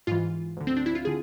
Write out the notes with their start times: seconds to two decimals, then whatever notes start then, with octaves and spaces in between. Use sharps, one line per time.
0.07 G#2 E3 F4
0.57 D2 D3
0.67 C4
0.76 D4
0.86 E4
0.95 F4
1.05 D3 G#4